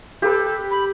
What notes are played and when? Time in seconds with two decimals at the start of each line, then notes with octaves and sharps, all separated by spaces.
0.22 G4 A4 B4
0.71 B5